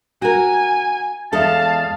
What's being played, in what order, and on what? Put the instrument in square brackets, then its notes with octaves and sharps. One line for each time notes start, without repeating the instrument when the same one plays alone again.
[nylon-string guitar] F#4 A#4 [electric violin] G#5
[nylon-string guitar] E2 G#3 A4 [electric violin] F5 [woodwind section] A5